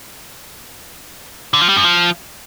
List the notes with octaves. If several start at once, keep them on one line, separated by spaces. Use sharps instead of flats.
D3
F3
G3
F#2
F3